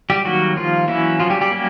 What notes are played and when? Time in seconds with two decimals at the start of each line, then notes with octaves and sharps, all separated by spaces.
0.10 G3 G4
0.25 D#3 F#3 G3 A#3 F#4
0.56 F3 F4
0.88 E3 F#3 A#3 C#4 E4
1.19 F3 F4
1.30 G3 G4
1.41 G3 G4
1.51 F#3 A#3 C#4